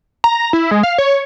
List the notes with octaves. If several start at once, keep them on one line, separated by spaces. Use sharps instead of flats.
A#5
E4
G#3
F5
C#5